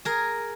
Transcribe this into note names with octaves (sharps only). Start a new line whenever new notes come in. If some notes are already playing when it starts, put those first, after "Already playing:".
G#4 A#4